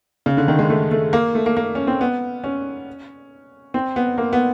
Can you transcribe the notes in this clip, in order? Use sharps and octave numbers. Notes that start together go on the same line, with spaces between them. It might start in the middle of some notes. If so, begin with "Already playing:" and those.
C#3
D3
D#3
G#3
A3
A3
A#3
A3
A#3
A#3
C#4
C4
B3
C#4
C4
B3
A#3
B3